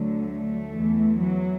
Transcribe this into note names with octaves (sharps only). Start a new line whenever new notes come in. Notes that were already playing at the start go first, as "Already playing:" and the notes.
Already playing: D2 D3 F#3
A3
E2 E3
F#3